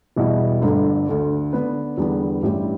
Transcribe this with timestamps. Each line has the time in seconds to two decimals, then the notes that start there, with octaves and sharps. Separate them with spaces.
0.16 E2 B2 G3 E4
0.62 G1 G2 D3 A3
1.07 D2 D3 A3
1.53 D3 B3 D4 B4
1.98 E2 D3 G3 B3
2.43 A1 G2 G3 E4 G4